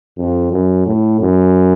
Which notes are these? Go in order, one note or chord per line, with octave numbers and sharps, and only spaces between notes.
F2
F#2
A2
F#2